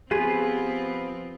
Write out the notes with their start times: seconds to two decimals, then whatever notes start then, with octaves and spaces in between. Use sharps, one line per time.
0.11 F3 B3 C4 F4 G4 G#4 B4